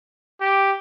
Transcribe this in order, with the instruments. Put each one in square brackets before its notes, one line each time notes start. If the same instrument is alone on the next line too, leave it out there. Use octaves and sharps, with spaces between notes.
[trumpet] G4